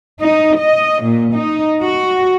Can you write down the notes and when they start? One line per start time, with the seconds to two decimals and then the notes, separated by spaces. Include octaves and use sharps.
0.21 D#4
0.57 D#5
1.03 A#2
1.34 D#4
1.82 F#4